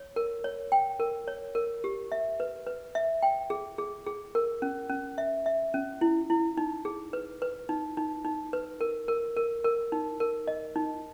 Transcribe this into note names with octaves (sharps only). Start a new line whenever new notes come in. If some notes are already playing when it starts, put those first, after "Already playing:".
Already playing: C#5
A#4
C#5
G5
A#4
C#5
A#4
G4
E5
B4
B4
E5
G5
G#4
G#4
G#4
A#4
C#4
C#4
E5
E5
C#4
E4
E4
D#4
G#4
B4
B4
D#4
D#4
D#4
B4
A#4
A#4
A#4
A#4
D#4
A#4
D#5
D#4